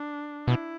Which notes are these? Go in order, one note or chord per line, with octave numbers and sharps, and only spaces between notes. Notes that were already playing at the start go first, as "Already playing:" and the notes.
Already playing: D4
B2 E4